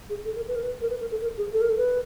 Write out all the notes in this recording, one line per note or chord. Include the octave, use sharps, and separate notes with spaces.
G#4
A4
A#4
B4
A#4
B4
A#4
B4
A#4
A4
A#4
G#4
A4
A#4
A4
B4